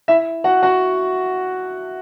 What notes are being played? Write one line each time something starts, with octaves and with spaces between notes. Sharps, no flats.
E4 E5
F#4 F#5
F#4 F#5